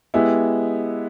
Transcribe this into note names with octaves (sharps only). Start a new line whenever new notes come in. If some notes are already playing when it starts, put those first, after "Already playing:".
G#3 B3 E4 G4